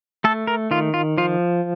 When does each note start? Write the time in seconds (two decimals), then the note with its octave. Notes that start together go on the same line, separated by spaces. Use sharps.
0.24 A3 A4
0.47 A#4
0.71 D#3 F4
0.94 F4
1.18 F3 F4